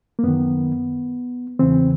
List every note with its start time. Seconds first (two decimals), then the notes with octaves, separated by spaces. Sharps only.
0.19 A#3
0.23 F#2 D#3 B3
1.59 E2 C#3 E3 C4